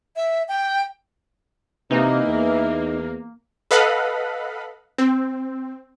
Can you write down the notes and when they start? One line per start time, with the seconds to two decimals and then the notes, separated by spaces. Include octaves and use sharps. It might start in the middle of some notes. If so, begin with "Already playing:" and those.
0.16 E5
0.48 G5
1.91 C3 E3 A#3 D#4
2.28 E2
3.71 A4 B4 D#5 F5 F#5 B5
4.98 C4